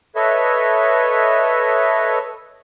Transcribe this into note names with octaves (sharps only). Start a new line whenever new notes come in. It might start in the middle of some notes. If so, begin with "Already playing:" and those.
A4 B4 C#5 D#5 E5